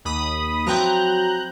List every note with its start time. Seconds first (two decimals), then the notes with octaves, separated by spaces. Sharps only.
0.05 D#2 B5 D#6
0.66 F3 F#3 C4 E4 A#5 F#6 G6